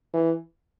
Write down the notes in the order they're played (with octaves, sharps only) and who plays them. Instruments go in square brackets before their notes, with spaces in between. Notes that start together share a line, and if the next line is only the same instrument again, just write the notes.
[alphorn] E3